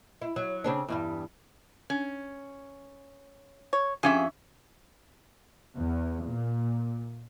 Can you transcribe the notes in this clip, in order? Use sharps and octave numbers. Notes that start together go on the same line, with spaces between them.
E4
F#3
C#3 C4 D4
E2 G2 G3
C#4
C#5
F2 C#4 F4 G4 G#4 E5
E2
A#2